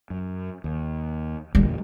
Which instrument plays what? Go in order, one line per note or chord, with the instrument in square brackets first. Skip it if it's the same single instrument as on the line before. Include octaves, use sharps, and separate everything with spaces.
[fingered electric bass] F#2
D#2
[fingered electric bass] E2 A#2 D3 [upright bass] G3